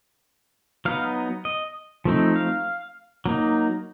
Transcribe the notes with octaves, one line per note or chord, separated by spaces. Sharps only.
F#3 B3 D#4 F5
D#5
F3 A3 C4 D#4
F5
F#3 A#3 D#4